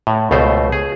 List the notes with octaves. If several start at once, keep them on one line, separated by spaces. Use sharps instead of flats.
A2
C#2 B2 A3 C5
G#4